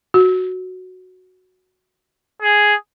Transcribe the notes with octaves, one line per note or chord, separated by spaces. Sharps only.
F#4
G#4